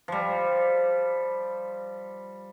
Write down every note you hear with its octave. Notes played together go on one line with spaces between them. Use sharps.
F3 G3